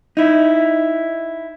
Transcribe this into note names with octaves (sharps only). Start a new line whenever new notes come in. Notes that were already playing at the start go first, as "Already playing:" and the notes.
D#4 E4